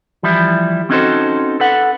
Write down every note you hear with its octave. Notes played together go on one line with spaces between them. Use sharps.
E3 F3 G3 E4
C4 C#4 D#4 F#4 A4 C5
A4 B4 F#5